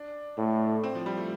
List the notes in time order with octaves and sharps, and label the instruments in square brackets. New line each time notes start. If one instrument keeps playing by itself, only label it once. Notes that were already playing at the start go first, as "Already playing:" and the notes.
Already playing: [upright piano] D4
[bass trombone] A2
[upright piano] C4
F3
G3
A3